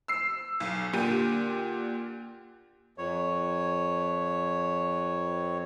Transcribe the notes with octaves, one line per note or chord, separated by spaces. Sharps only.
E6 C7
B1
A#2 D3 G4 D#7
F2 C#5